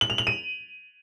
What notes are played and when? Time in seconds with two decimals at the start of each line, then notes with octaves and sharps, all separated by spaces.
0.01 F#7
0.10 F7
0.18 F#7
0.27 D#7